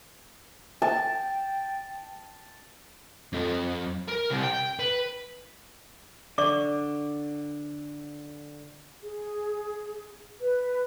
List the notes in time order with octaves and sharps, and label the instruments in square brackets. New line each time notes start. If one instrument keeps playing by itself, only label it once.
[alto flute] G5 [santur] A5
[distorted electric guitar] F2
A#4
C2
G5
B4
[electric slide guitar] D3 [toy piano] D5 C#6 D6
[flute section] G#4
B4